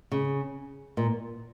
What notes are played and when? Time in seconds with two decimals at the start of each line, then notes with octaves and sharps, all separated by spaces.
0.12 C#3
0.97 A#2